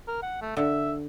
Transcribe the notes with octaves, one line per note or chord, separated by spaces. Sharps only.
A#4
F#5
A3
D3 E5